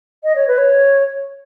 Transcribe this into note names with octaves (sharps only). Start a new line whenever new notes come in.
D#5
C#5
B4
C#5